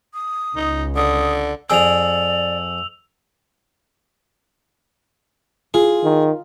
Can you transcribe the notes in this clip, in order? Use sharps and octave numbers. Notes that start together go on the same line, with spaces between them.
D#6
C#2 D#4
D3 D#6
F2 G#4 D5 G5 E6 F7
F4 G#4
D#3